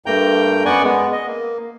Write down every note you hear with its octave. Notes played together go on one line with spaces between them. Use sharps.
G2 A3 A#3 G5 A#5 G6
F#2 B3 D5 F#5 G#5 C#6
G#3 B3
D#5
A#3